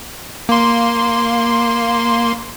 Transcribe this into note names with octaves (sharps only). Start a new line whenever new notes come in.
A#3 C6